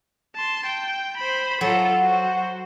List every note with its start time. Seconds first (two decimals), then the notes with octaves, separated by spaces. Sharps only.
0.36 A5 C6
0.66 G5
1.17 C5 B5
1.61 F#3 F4 A4
2.00 F#4 C5